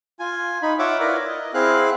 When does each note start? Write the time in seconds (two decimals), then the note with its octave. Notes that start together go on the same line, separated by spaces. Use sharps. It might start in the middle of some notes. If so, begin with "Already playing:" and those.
0.20 F4 G#5
0.62 D#4 B5
0.79 F4 C#5 E5 F#5 D6
1.00 E4 A#4 B4 D5
1.27 D#5
1.54 C4 E4 G#4 F5 F#6